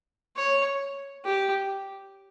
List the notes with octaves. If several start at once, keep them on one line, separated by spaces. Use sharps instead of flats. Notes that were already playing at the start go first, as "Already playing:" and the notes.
C#5
G4